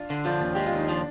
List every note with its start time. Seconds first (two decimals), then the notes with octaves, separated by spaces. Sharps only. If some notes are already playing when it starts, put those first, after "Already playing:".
Already playing: D4 F4
0.10 D3
0.25 F3 D4 F4
0.41 D#2
0.55 G#3 G4
0.66 F4
0.72 D#2 D#4
0.88 F3 D4